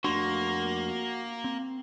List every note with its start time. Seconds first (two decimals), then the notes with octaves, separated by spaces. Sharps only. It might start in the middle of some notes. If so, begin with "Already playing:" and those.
0.04 F2 A3 A#3 D4 F#4 C6
1.44 C4